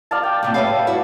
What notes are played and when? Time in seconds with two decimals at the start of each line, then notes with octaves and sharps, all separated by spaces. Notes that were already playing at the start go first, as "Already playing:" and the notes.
0.11 D5 F5 A5
0.23 G5
0.43 A2 C3 A#3
0.54 G3 B4 C#5 E5 F5
0.87 G2 E4 F#4